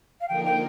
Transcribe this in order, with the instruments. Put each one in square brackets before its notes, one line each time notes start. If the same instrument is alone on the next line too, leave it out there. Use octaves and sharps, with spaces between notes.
[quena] F5
[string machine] D3 F3 A#3 D#4 A#4 [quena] G5
[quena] G5